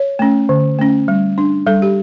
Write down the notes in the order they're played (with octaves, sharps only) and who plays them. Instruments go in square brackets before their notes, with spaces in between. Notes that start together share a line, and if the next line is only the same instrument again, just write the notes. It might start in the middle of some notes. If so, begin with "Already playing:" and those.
Already playing: [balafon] C#5
A3 C#4
D3
A3 C#4
G3
D4
G3 A4
G4